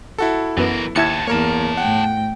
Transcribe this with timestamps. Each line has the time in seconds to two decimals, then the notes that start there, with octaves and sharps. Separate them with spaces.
0.18 E4 F#4 A4
0.57 F#2 E3 B3 A#4
0.96 D#2 B3 E4 A5 G#6 C#7
1.27 E2 A#3 A#4 C#5 A5
1.77 A2 F#5 G5